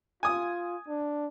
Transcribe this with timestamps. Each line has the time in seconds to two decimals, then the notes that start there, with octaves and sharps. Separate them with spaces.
0.23 F4 G#5 D#6
0.88 D4